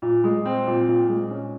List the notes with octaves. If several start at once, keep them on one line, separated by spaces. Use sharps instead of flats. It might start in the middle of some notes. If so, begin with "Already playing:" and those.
A#2
G#3
C4
A#2
A#2
G#3
C#4